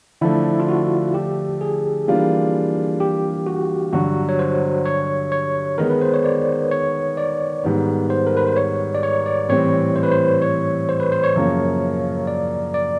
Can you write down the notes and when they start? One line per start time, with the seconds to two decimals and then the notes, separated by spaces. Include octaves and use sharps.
0.21 D3 F3 A3 D4 E4
0.60 F4
0.69 F#4
1.14 G4
1.61 G#4
2.08 E3 G3 A#3 D4 F4
3.00 G4
3.47 F#4
3.93 G2 D3 F#3 F#4
4.29 C#5
4.39 C5
4.85 C#5
5.32 C#5
5.78 D#3 G#3 B3 D#4 A#4
5.90 B4
6.01 C5
6.14 C#5
6.24 D5
6.71 C#5
7.17 D5
7.64 G#2 D#3 G3 B3
8.10 C5
8.27 A#4
8.37 B4
8.47 C5
8.57 C#5
8.95 D5
9.03 C#5
9.26 D5
9.49 A2 E3 G3 C4 C#5
9.96 C5
10.03 B4
10.12 C5
10.42 C#5
10.89 C5
11.00 B4
11.12 C5
11.23 C#5
11.36 F#2 C#3 F3 A#3
12.27 D5
12.74 D5